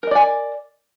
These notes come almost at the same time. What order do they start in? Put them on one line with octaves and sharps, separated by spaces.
A#4 D#5 D5 G#5